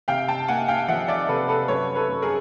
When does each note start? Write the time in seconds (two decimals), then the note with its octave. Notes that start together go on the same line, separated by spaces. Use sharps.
0.08 C3 F5 G5
0.28 G5 A5
0.48 A#3 F#5 G#5
0.68 F5 G5
0.88 F3 E5 F#5
1.08 D5 E5
1.29 C3 A4 B4
1.48 A4 B4
1.68 F#2 B4 C#5
1.96 A4 B4
2.09 F#2
2.22 G#4 A#4